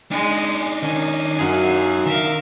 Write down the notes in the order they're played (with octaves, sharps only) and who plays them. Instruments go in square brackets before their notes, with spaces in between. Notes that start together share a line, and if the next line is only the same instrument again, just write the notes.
[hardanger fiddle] G#3 [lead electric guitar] D4 D#4
[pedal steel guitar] D#3 C#4 [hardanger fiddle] G#5
[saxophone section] F#2 [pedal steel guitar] G#4 F5 F#5
[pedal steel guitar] D#3 A#4 [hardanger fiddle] E5 F5